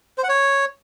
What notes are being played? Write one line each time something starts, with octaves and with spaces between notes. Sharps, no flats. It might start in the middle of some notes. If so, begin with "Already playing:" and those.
C5
F#5
C#5